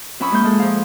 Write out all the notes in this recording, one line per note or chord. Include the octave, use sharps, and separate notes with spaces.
F2 C#4 E5 B5 C#6 D#6
G#3 A#3 C#6 G6
G#3 G#4 A4
F3 F5